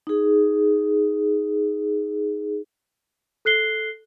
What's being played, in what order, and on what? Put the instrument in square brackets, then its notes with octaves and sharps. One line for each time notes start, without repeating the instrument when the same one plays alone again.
[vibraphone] D#4 G#4
[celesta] A4 F#6 C7 G7